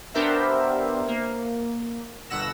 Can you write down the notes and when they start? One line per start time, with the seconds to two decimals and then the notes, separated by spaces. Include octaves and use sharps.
0.14 B3 D4 G4 A#4 C5 E5
1.08 A#3
2.30 G1 B2 F#5 E6 A#6 E7